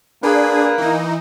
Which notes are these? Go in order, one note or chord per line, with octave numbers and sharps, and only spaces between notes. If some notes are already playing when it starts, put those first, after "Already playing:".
A#3 D4 G#4 B4
E3 D#4